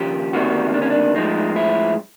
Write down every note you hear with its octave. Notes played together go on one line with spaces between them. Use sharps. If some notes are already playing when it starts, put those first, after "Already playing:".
Already playing: D#2 C#3 F3 G4
D2 C3 D#3 G3 A#3 F#4
D4
C#4
D4
A2 F3 G#3 D#4
E4